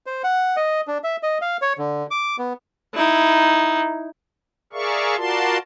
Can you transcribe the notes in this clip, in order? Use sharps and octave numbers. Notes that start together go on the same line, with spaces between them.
C5
F#5
D#5
D4
E5
D#5
F5
C#5
D3
D6
B3
D#4 E4
G#4 A#4 D5 E5 F5 C#6
F4 F#4 A#4 D5 A5 C6